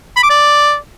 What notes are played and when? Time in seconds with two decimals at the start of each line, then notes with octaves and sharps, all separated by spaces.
0.16 B5
0.23 D6
0.30 D5